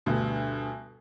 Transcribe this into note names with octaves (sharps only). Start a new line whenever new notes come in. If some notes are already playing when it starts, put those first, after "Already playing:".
D2 G2 B2